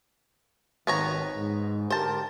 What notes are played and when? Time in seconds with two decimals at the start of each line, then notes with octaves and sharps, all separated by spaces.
0.87 G#1 D#3 B3 C#5 A#5
1.36 G#2
1.90 D3 G4 A#4 C5 A5